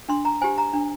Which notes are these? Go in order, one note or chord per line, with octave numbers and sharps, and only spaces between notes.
D4 C6
A#5
G4 C5 G#5
A#5
D4